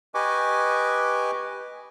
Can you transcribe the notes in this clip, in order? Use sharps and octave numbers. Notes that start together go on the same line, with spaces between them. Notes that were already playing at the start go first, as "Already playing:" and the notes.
G4 B4 D#5 G#5 C#6 D6